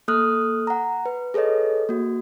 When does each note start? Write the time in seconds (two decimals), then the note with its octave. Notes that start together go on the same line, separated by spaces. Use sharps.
0.08 A#3 A4 D#6 F6 F#6
0.67 F#5 A#5
1.06 B4
1.34 G#4 A4 B4 C#5 D#5
1.89 A#3 F#4